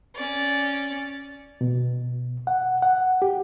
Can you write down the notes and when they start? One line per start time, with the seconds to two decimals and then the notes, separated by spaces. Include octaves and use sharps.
0.15 C#4 D5
1.61 B2
2.47 F#5
2.82 F#5
3.22 G4